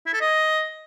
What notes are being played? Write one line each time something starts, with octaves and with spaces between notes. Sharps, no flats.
E4
A4
D#5